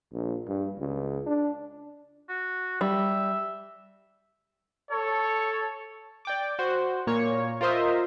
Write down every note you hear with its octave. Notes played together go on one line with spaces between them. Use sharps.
A#1
G2
C#2
D4
F#4
G3 E5
A4 C#5
D5 G5 D6
F#4 C5
A#2 A#3 C#5 C#6
F4 A#4 C5 D#5 E5